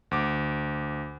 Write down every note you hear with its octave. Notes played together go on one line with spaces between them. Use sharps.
D2 D6